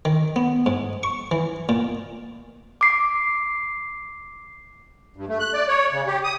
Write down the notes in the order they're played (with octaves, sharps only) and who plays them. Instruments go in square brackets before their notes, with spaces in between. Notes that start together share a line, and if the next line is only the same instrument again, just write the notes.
[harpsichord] D#3
B3
G#2
C#6
E3
A#2
[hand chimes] D6 C7
[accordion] G2
A3
F#6
D5
C#5
C#3
G4
D#6